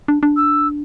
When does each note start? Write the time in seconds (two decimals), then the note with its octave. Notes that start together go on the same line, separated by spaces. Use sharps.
0.08 D4
0.23 D4
0.37 E6